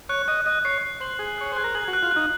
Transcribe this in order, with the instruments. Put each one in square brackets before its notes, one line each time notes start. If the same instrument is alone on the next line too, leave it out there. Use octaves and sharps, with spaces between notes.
[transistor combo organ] C#5 [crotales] F#6
[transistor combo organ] D#5 [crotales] F#6
[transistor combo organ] D#5 [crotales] F#6
[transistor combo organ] C#5 [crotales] C7
[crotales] C7
[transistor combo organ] C5 [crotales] F#7
[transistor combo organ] G#4 [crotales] F#6
[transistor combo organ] C#5 [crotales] F#6
[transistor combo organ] C5 [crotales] F#6
[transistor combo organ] A#4
[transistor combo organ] G#4 [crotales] F#7
[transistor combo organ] F#4
[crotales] F#6
[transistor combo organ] F4
[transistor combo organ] D#4 [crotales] F#6